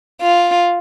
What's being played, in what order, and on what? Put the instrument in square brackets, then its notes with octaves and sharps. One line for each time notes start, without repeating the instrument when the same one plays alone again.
[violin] F4